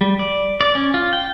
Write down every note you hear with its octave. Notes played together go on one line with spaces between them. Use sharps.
G3
D5
D5
C#4
F4
G5